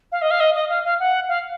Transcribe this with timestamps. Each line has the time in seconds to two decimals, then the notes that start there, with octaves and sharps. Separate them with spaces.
0.12 F5
0.22 D#5
0.31 F5
0.40 D#5
0.55 D#5
0.69 F5
0.84 F5
1.00 F#5
1.29 F5